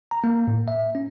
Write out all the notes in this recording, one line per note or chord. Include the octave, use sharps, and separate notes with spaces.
A#5
A#3
A2
E5
C#4